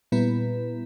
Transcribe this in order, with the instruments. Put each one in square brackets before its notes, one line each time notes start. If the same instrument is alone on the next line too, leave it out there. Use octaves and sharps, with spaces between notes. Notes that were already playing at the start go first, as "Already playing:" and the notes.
[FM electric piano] A#2 G3 B3 E4 B4